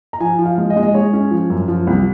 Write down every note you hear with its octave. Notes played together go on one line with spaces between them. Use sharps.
A#5
F3 G#5
F3
F5
G#3
D#5
G#3
D#5
G#3 C#5
C#4
F3
F#2
F3
C2